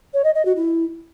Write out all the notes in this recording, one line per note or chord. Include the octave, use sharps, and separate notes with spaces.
C#5
D#5
D#5
F#4
E4